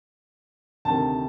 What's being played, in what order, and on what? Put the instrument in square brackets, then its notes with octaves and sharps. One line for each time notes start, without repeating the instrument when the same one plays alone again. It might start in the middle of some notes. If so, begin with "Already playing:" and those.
[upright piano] D2 C3 D#3 A5